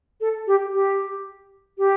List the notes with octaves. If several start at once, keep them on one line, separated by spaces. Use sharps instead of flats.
A4
G4
G4
G4